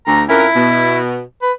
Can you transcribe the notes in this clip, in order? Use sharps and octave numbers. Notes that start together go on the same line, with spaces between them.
D2 A#5
F2 C#4 E4 A#4
B2
B4